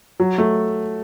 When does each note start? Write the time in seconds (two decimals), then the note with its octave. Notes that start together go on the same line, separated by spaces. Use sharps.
0.20 F#3
0.38 A3